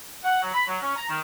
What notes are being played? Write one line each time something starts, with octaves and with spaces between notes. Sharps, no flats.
F#5
F#3
B5
F#3
C#4
A#5
D#3